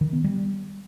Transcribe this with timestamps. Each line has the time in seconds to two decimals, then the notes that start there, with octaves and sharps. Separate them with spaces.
0.01 D#3
0.13 B3
0.24 G3